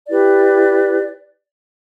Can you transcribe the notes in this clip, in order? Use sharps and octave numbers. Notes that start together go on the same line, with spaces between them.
E4 G4 B4 D5